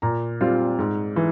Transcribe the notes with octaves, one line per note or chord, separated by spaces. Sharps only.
A#2 A#5
G3 C4 F4
G#2
E3